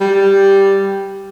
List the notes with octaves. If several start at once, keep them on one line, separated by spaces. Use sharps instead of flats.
G3